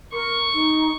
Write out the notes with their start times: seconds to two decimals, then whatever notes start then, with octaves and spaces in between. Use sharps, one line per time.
0.13 A#4 C#6
0.54 D#4